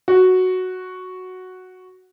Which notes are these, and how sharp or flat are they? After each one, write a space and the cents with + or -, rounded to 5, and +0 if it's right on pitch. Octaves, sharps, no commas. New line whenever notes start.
F#4 +0